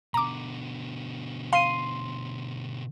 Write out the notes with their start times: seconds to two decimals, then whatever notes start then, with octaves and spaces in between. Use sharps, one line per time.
0.14 B2 D3 A#5 D6
1.53 F5 C6 C7 D#7